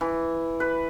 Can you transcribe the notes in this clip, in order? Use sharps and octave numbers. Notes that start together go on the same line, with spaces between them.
E3
B4